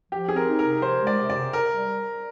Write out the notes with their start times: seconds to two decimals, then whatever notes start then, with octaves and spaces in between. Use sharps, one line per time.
0.12 F3 G4
0.28 C4 G#4
0.36 A#4
0.48 D#4
0.59 A#4
0.65 C3
0.82 F3 C5
1.01 G#3
1.07 D5
1.18 C3
1.30 D5
1.36 C3
1.53 C3 A#4
1.72 G3